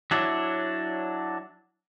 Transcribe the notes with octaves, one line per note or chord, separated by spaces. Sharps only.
F#3 D4 E4 C#5